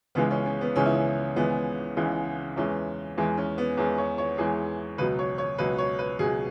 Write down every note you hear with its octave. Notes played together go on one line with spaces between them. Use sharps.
C#2 C#3 E3 G#3 B3
C#4
C#4
B3
C#2 C#3 E3 G#3 C#4
E4
C#4
C#2 C#3 E3 G#3 B3
C#2 C#3 E3 G#3
E2 E3 G#3 C#4
E2 E3 G#3
C#4
B3
E2 E3 G#3 C#4
C#5
C#5
E2 E3 G#3 G#4
C#2 B2 F#3 B4
C#5
C#5
C#2 B2 F#3 B4
C#5
B4
C#2 B2 F#3 G#4